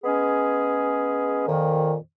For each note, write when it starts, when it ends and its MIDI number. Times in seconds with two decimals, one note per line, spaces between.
0.04 1.45 56
0.04 1.45 59
0.04 1.45 61
0.04 1.45 68
1.48 1.96 41
1.48 1.96 46
1.48 1.96 51